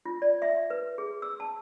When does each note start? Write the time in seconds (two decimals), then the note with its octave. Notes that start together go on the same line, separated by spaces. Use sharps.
0.06 F4
0.22 D5
0.42 E5
0.70 B4
0.98 G#4
1.22 E6
1.40 A5